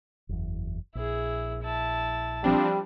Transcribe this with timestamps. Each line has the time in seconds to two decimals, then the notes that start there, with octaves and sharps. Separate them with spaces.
0.29 F#1 E2
0.95 A#1 E4 G#4
1.63 E4 A5
2.44 F3 G3 C4 D4